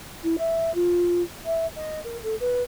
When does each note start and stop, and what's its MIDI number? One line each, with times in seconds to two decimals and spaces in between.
0.23 0.36 64
0.38 0.73 76
0.74 1.22 65
1.45 1.66 76
1.75 1.99 75
2.04 2.18 70
2.23 2.35 69
2.40 2.63 71